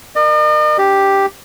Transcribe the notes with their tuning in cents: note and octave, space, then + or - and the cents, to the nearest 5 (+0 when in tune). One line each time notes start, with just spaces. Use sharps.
A#4 +0 D#5 -45
D4 +0 G4 +0